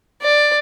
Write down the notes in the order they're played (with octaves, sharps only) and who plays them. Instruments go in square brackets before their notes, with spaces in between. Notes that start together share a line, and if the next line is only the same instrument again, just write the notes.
[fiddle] D5